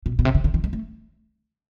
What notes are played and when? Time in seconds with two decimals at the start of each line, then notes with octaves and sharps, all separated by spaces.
0.06 B2
0.19 B2
0.25 C3
0.35 C#3
0.44 D3
0.54 D#3
0.64 G#3
0.73 A3